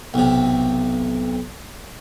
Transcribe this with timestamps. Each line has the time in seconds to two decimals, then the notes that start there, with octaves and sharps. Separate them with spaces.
0.14 B1 C3